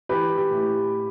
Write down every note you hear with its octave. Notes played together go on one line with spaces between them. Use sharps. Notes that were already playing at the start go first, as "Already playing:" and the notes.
E3 G4 B4
G4
A2